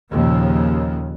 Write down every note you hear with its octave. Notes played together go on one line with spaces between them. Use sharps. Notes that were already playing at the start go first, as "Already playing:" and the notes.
D#2 A#2 C#3 F3